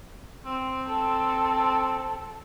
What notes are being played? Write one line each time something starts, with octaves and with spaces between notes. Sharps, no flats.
C4
A4